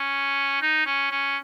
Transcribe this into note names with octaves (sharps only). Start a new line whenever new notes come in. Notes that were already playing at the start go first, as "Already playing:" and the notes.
Already playing: C#4
D#4
C#4
C#4